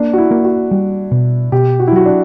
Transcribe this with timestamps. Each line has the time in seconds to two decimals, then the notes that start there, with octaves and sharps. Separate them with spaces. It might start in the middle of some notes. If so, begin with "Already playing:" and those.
Already playing: A#3 D4
0.13 F#4
0.18 E4
0.31 A#3
0.45 F#4
0.71 G3
1.12 B2
1.52 B2 G4
1.80 F#4
1.88 E4
1.92 F#3 F#4
2.06 D4